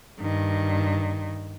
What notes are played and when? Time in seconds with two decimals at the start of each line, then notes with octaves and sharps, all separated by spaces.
0.20 G2 D#3